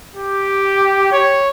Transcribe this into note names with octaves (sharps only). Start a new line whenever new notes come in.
G4
C#5